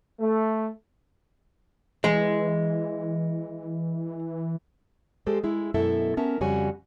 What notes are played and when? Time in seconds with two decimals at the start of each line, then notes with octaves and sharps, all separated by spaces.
0.20 A3
2.04 E3 G#3
5.27 G#3 G4 A4 C5
5.44 G#3 E4
5.74 F#2 B2 G#3 E4 A4 E5
6.17 B3 C#4 A#4 E5 A5
6.41 F2 C#3 G3 F#4 C#5 G#5